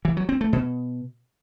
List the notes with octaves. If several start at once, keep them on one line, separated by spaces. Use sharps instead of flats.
E3
F#3
C4
A3
B2